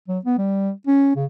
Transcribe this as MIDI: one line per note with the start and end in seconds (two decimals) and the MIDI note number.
0.08 0.19 54
0.25 0.37 59
0.38 0.71 55
0.87 1.12 61
1.16 1.25 49